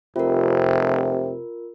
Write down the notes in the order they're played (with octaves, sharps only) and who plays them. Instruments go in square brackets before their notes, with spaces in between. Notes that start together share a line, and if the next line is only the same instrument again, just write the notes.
[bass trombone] F1 [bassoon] C3 [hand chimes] F4 A#4